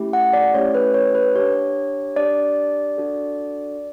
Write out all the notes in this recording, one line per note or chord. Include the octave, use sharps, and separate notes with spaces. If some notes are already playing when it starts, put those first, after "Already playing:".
Already playing: A3 C#4 E4 G4
F#5
D5
A3 C#4 E4 G4 C#5
B4
C#5
B4
D4 G4 C#5
D4 G4 D5
D4 F#4 A4